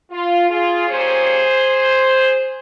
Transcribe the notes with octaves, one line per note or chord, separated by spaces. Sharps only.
F4
F4 G#4
A#2 G3 C#4 G#4 C5